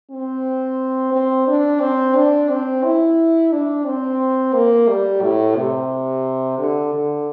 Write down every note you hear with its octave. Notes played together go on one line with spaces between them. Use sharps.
C4
C4
D4
C4
D4
C4
E4
D4
C4
A#3
G3
A2
C3
D3
D3